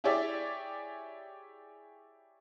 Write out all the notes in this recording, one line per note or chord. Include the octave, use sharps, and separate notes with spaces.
E4 G4 G#4 C#5 D5 E5